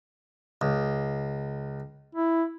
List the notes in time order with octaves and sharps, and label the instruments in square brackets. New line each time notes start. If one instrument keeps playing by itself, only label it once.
[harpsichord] C#2
[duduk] E4